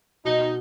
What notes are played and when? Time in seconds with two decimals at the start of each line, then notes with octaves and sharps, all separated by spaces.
0.25 B2 D#4